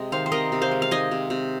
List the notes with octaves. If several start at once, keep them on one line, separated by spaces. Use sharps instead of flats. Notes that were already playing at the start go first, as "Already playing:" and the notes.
Already playing: C3 G#3 D#5
D#3 C5 F5
C5
C3 A#4 D#5
C3
C5 F5
G#3
F5
D#3 D#5 G#5
C3
C3